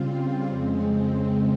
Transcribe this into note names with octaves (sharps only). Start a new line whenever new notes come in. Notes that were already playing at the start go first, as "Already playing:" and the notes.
Already playing: C#3 G3 C4 F4
F2 C#3 G#3 C4